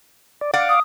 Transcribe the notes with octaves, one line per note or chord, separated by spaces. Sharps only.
D5
D5 F5 F#5 D6
D#6